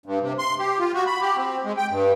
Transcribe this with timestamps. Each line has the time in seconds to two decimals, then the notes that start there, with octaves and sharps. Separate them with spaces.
0.06 G2
0.21 C3
0.39 C6
0.59 G4
0.79 F4
0.95 F#4
1.07 B5
1.21 G4
1.37 C4
1.65 G#3
1.77 G5
1.90 G2